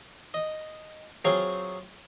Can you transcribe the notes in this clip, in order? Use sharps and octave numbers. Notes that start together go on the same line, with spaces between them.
D#5
F#3 C4 F4 G#4 C#5 C#6